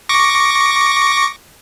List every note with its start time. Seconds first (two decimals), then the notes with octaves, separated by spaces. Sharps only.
0.09 C#6 D6 A#6